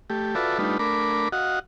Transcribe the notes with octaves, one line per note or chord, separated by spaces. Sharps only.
A3 G4
F4 F#4 A4 B4 D5 E5
G3 A3 D4 D#4 F4 B4
A3 D4 A#4 B5 D6
F#4 D#5 F5 F#5